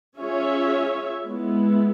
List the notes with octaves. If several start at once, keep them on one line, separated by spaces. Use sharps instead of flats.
C#4 F4 G#4 C#5 E5
G#3 B3 E4